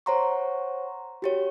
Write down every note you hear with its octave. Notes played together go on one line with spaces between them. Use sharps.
C5 C#5 F#5 A#5 C6 C#6
F#4 G4 C#5